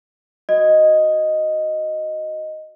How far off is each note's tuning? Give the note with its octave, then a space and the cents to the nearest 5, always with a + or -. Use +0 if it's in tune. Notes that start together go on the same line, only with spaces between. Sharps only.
F#4 +0 D#5 +0